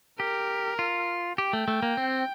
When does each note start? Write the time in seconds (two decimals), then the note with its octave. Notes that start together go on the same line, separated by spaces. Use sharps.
0.20 G4 A#4
0.79 F4
1.38 G4 G5
1.53 A3
1.68 A3
1.82 A#3
1.97 C4